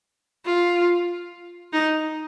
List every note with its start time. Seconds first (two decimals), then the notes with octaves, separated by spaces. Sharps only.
0.45 F4
1.73 D#4